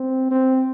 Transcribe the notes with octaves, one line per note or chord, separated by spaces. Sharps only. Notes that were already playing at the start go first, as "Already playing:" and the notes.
Already playing: C4
C4